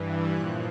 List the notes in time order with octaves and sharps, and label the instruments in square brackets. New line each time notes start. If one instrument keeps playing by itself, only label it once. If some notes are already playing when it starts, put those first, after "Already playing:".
Already playing: [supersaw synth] G2 E3
A#2 F3 F#6